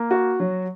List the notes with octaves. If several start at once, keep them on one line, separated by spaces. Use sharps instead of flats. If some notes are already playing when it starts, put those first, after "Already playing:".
Already playing: A#3
F#4
F#3